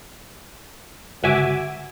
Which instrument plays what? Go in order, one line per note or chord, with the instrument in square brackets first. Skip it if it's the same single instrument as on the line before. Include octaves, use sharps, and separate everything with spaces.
[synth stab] G1 C#2 F#4 E5 G#5 D6